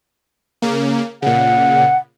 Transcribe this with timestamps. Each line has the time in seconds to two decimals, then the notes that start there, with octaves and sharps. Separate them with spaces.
0.62 C#3 A#3
1.22 A#2 C#3 F#5